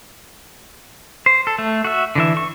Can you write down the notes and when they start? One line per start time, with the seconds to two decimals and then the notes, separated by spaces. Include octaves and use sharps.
1.26 C5
1.47 A4
1.59 A3
1.84 F#4 E5
2.15 D3 E3 E5
2.37 C#6